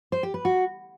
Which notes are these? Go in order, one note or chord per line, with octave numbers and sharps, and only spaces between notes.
C5
G4
B4
F#4